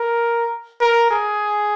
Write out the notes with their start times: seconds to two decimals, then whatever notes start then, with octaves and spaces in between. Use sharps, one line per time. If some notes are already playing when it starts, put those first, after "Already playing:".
Already playing: A#4
0.80 A#4
1.10 G#4